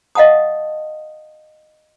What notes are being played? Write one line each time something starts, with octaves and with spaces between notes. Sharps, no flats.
D#5 F5 F#5 A5 D#6